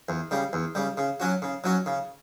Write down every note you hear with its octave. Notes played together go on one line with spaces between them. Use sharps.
E2
C#3 G3
E2
C#3 G3
C#3
F#3 C#4 F#4
C#3
F#3 C#4 F#4
C#3